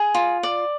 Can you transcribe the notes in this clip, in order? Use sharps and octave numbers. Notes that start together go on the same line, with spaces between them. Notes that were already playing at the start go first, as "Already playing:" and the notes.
Already playing: G#4
F4
D5